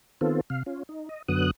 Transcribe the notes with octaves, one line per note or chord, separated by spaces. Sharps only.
D#3 B3 C4 F4 A4
C3 F5
C#4 F4
D#4
D#5
F#2 D3 F#3 B3 D#6 F#6